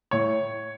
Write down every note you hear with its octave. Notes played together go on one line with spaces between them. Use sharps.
A2 C#5